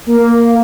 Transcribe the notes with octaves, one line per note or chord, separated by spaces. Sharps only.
A#3